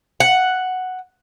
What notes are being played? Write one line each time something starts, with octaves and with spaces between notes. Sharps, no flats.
F#5